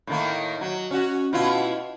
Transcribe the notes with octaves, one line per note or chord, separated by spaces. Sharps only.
A2 D#3 A#3
F#3
C#4 F#4
B2 E4 F4